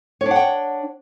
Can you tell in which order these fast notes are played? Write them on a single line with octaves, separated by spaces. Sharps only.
C#5 D4 F#5 G5